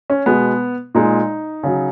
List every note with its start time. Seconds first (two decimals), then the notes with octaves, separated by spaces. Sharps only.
0.10 C#4
0.26 B2 G#3 B3
0.95 A#2 G#3 D#4
1.63 C#3 F#3